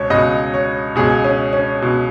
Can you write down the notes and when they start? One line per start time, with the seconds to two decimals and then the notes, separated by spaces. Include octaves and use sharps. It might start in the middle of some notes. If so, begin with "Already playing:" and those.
Already playing: C#2 B2 C#5
0.10 C#2 B2 D#5
0.54 C#5
0.96 C#2 B2 G#4
1.24 C#4
1.53 C#4
1.82 B2